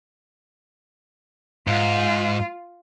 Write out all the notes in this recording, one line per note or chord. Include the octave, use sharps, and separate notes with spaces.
G#2 F4